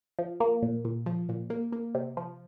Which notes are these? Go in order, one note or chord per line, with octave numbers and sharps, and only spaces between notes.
F3
A#3
A#2
A#2
F3
A#2
A#3
A#3
C3
F3